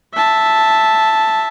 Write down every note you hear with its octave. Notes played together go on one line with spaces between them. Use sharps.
E5 A5